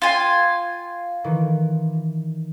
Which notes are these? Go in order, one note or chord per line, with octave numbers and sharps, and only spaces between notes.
F4 G5 G#5 F6
D#3 E3